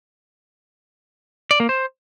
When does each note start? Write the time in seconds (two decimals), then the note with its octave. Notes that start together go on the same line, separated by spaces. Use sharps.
1.51 D5
1.60 A#3
1.69 C5